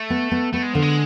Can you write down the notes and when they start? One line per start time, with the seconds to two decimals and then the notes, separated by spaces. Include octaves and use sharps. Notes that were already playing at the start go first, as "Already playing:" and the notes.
Already playing: A3
0.10 B3
0.32 B3
0.53 A3 B3
0.63 G#3
0.73 D3 F3
0.82 G#3